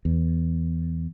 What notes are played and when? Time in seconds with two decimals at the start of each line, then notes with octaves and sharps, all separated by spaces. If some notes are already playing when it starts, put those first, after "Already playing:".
0.05 E2